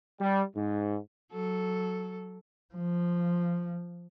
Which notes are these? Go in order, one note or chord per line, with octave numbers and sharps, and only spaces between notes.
G3
G#2
F#3 A4
F3